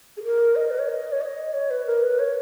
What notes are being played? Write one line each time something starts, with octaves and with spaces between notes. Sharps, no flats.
G#4
A#4
D#5
B4
C#5
D#5
C#5
D#5
C#5
B4
A#4
B4
C#5